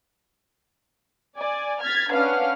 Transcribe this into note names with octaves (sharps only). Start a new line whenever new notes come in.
D5 G#5
F6 G#6 A6 B6
C#4 D4 B4 F5 F#5 F6